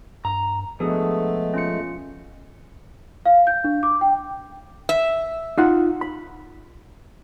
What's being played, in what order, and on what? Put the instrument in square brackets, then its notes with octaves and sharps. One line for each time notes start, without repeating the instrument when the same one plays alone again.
[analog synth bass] G2 [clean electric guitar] A#5
[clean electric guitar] B2 [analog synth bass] F3 [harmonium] G#3 A3 [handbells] D4 G#4 A4
[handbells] C#4 F4 C#7
[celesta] F5
G6
D4
D6
G5
[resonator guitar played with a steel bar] E5
[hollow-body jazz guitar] D#4 F4 F#5
B5